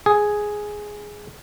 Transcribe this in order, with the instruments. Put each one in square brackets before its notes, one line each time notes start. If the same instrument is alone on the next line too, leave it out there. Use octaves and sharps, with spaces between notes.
[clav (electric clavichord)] G#4